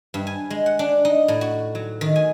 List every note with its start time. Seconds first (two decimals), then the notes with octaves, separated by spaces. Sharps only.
0.14 G2
0.27 G#5
0.50 G#3
0.66 F#5
0.79 D4
1.05 D#4
1.28 A2
1.41 F#4
1.75 F#3
2.01 D#3
2.16 G#5